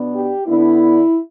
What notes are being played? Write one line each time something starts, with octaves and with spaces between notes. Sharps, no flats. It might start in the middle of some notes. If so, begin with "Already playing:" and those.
Already playing: B2 B3 D4
G4
D3 B3 D4 E4